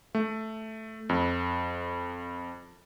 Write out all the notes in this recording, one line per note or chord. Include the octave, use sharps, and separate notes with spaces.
A3
F2